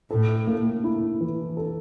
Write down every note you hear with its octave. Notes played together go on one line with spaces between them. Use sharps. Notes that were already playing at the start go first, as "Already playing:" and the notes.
A2 A4
A#3
E4
E3
A4